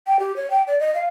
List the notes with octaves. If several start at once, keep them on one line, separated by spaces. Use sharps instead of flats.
G5
G4
C#5
G5
D5
D#5
F5